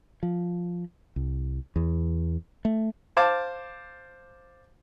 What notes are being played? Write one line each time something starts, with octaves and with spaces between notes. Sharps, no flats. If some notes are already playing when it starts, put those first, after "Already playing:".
F3
C2
E2
A3
C5 F5 A5 D6